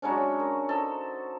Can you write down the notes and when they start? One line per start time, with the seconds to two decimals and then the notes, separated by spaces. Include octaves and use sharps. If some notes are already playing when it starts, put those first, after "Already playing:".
0.02 F#3 G#3 C#4 D4
0.39 A#4
0.69 D#4 A4 C5